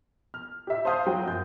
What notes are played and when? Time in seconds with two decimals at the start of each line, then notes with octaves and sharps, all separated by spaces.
0.34 F6
0.67 G4 E5
0.85 C5 F5 A5 D#6 G6
1.07 F#3 F#4 G5
1.26 F#2 G6